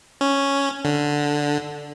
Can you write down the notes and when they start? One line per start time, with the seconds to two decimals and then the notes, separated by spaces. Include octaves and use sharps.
0.21 C#4
0.85 D3